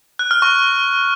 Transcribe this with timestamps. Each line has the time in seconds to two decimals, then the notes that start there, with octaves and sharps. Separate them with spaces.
0.19 F#6
0.31 F6
0.42 C#6